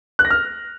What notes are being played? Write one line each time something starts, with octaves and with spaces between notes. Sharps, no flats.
F#6
A#6
F6